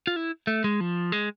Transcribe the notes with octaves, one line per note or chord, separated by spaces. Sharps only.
F4
E4
A3
G#3
F3
G#3